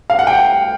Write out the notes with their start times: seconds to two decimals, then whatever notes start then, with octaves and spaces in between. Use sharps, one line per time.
0.10 F5
0.19 F#5
0.27 G5